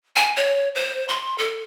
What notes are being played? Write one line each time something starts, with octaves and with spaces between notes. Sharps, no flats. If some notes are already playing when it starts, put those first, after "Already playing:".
G#5
C#5
C5
C6
A4